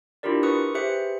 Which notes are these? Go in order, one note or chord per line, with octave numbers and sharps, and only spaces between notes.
D4 E4 F4 G4 A#4 D5
A#4 B4 C#6 D#6 C#7
G4 G#4 B4 C5 E5 C#7